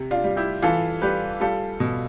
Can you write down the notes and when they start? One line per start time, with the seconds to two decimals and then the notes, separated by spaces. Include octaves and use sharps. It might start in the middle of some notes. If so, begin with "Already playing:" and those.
Already playing: C3
0.11 D4 F4
0.24 G3
0.36 E4 G4
0.62 E3 F4 A4
1.02 G3 G4 B4
1.40 G3 F4 A4
1.80 B2